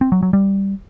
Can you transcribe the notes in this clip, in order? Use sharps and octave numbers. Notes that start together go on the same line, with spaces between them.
C4
F#3
F#3
G3